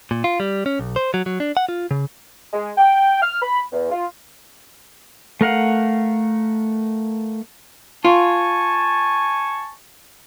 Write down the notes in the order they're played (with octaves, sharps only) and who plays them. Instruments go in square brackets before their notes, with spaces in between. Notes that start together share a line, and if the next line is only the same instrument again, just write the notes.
[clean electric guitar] A#2
F4
G3
C#4
B1
C5
F#3
F#3
D4
F#5
F4
C#3
[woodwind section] G#3
G5
F6
B5
E2
F4
[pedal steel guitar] A3 A#4 F5 F#5
[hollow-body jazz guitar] F4 [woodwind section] G#5 A5 C#6